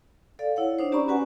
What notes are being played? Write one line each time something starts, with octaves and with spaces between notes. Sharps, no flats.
A4 D5 F5
E4 C#5 F#5
D4 D#4 C5
C#4 G4 D5 A#5 B5 C#6
C#4 F#4 B4 F#5 G#5